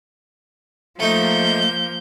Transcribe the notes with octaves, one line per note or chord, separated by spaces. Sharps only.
F3 A3 A#3 D#4 G6